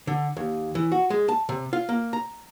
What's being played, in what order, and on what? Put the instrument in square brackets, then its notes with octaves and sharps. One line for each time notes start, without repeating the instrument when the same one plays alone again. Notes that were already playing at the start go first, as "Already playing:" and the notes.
[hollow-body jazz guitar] D3
D#2
E3
F#4
G#3
A5
C3
F4
A#3
A#5